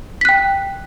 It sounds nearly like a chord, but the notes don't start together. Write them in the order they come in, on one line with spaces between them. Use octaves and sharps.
B6 F#6 G5